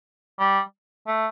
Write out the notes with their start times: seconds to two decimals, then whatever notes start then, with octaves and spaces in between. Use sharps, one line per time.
0.39 G3
1.07 A3